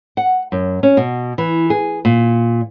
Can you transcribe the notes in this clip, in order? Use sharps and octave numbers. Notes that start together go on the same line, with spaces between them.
F#5
F#2
C#4
B2
E3
G#4
A#2